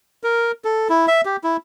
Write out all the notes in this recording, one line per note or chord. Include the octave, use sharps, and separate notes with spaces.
A#4
A4
E4
E5
G4
E4